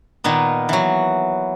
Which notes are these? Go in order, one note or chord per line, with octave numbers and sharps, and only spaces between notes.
A#2 D#3 A#3 B3
E3 F#3